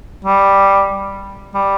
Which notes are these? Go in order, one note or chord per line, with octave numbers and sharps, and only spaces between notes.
G3
G3